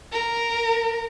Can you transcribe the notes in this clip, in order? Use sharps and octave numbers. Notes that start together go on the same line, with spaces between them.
A#4